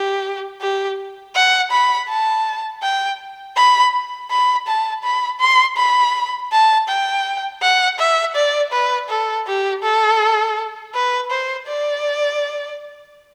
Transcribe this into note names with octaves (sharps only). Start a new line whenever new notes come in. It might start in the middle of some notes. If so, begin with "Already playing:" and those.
Already playing: G4
G4
F#5
B5
A5
G5
B5
B5
A5
B5
C6
B5
A5
G5
F#5
E5
D5
B4
A4
G4
A4
B4
C5
D5